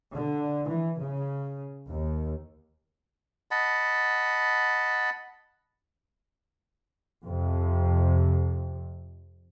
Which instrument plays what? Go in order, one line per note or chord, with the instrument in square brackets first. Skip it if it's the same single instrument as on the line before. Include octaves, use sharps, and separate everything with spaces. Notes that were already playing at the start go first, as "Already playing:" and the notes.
[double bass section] D3
E3
C#3
D#2
[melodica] D#5 F#5 A5 B5
[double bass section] F2 C3